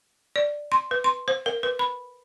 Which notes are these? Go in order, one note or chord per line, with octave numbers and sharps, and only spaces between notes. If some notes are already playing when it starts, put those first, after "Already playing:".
D5
C6
B4
C6
C5
A#4
B4
B5